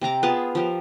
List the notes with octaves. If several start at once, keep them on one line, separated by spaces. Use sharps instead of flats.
C3 C4 A#5 D6
B3 F4 G#4 A5
F3 G4 A#4